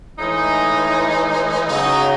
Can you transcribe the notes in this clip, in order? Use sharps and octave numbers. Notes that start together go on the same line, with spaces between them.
A2 E3 G#3 D#4
C#3 F#3 D#4